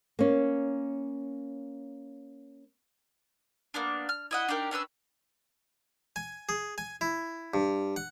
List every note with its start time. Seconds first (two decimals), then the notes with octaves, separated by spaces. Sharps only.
0.19 A#3 C#4
3.74 A#3 B3 D4
4.09 F6
4.31 E4 D#5 F#5
4.48 D4 D#4 G4 A#4
4.71 C#4 D4 B4 E6
6.16 G#5
6.49 G#4
6.78 G#5
7.01 E4
7.54 G2
7.96 F#5